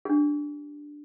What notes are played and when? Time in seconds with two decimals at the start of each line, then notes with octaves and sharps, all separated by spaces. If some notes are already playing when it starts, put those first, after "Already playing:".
0.05 D4 G4